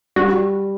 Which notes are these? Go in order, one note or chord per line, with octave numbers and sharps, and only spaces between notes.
G3 F#4